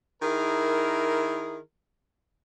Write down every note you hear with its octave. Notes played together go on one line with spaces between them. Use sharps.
D#3 E4 G#4 A#4